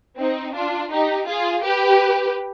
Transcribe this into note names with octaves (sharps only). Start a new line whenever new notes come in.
C4 D#4
D4 F4
D#4 G4
F4 G#4
G4 B4